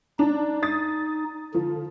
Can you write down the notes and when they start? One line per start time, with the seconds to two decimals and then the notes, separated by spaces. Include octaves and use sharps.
0.19 D4 D#4 D5
0.63 D#6 A6
1.54 D3 F3